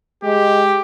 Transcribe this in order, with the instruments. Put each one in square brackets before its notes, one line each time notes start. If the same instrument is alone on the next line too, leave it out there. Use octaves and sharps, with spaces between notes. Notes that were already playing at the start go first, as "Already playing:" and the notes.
[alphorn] G#3 [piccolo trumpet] G4